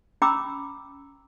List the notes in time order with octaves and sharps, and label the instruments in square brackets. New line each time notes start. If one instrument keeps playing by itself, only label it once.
[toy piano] C#4 G5 A#5 B5 D6 E6